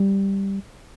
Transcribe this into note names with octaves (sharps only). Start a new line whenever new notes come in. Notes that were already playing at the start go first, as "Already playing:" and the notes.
Already playing: G3